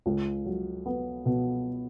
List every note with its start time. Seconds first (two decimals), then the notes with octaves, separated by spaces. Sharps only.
0.06 C#2
0.46 F#3
0.86 B3
1.26 B2